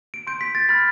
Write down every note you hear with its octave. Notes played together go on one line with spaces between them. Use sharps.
D7
C6 G6 D7
B6
A6
B5 F6 A6